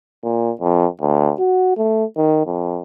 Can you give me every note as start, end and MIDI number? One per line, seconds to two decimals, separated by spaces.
0.24 0.51 46
0.61 0.87 41
1.01 1.32 38
1.39 1.74 66
1.77 2.04 57
2.17 2.41 51
2.46 2.82 41